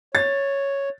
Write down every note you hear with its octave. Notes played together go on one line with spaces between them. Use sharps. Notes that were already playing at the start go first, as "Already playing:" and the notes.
C#5 A6